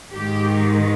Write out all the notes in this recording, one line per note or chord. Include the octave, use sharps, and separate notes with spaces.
G#2 D#3 G#3 G4